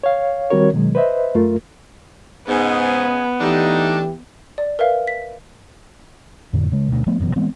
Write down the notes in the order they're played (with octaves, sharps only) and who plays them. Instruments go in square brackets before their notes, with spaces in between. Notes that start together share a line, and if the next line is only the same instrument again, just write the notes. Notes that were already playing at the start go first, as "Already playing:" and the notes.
[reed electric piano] C#5 F5
D#3 G3 C4 F#4 A#4 C#5
B2 D#3 F#3 G#3
B4 C5 D#5 E5
F#2 A3 F4 A#4
[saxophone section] G#2 [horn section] C#3 D#5 G#5 [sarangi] B3
[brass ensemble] E3 G4 [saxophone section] A3 D4 [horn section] D#4
[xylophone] D5
A#4 B4 E5 F5
B6
[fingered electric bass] F2 A2 D3
C#3 G#3
D2 B2
F3 A3 B3
F1 F#2 B2 E3
E3 G#3 B3 C4